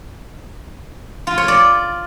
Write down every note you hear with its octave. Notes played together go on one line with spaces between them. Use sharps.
F4
C#5
D5